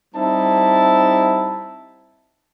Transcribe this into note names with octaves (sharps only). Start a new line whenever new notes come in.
G3 C4 D#4 E4 A5